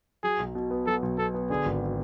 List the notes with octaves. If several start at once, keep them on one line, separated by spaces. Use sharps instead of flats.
F#3 G#4
B1
B2
B3
F#3 A4
B1
B2 A4
B3
D3 G#4
G#1